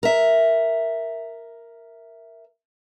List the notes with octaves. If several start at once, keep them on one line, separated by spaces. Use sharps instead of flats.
A#4 E5